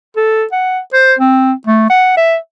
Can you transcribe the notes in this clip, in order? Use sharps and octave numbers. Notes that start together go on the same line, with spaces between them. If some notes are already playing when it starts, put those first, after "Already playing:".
A4
F#5
C5
C4
A3
F#5
E5